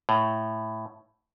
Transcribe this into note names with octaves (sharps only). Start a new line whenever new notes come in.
A2